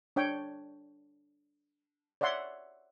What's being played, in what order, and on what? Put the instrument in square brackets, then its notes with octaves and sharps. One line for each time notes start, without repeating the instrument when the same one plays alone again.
[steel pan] D4 C#5 G5
C#5 D5 E5 F#5 C6